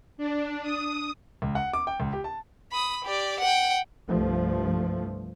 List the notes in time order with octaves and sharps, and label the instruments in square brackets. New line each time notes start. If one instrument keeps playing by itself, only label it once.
[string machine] D4
D#6
[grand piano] C#2
F#5
D6
G5
C#2
G4
A5
[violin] B5 D#6
G4 D5
F#5 G5
[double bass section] C2 G2 F3 A3